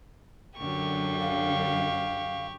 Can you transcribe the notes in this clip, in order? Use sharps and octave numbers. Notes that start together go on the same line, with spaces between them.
F#2 D3 G4 C#6
F5